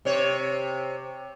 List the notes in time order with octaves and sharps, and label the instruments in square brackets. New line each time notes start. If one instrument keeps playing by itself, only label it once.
[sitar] C3 C#5